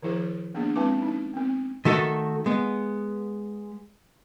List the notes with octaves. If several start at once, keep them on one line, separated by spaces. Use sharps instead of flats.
D#3 F3 E4 G#4 C5
A#3 B3 D4 G#4
G#3 C4 E4 B4 A5 D6
C#4 D#4
B3 C4
D#3 A3 F#4 A4
G#3 B3